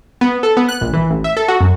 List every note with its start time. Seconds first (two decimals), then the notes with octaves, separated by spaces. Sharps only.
0.21 B3
0.43 A4
0.57 B3
0.69 F#6
0.81 A#1
0.93 E3
1.10 A1
1.24 E5
1.37 A4
1.48 F#4
1.61 F#2